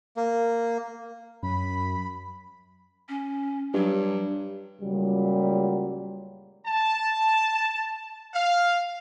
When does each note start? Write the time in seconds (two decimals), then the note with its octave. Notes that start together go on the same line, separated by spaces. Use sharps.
0.17 A#3
1.43 F#2 B5
3.09 C#4
3.74 G2 F#3
4.82 C#2 A#2 F#3 G3
6.67 A5
8.34 F5